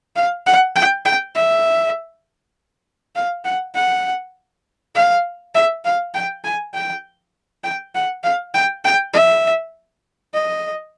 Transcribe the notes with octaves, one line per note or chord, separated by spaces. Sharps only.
F5
F#5
G5
G5
E5
F5
F#5
F#5
F5
E5
F5
G5
G#5
G5
G5
F#5
F5
G5
G5
E5
D#5